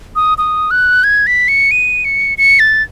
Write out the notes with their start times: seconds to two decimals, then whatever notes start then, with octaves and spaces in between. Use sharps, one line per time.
0.16 D#6
0.38 D#6
0.71 F#6
1.04 G#6
1.27 B6
1.48 C#7
1.71 D#7
2.05 C#7
2.38 C#7
2.59 A6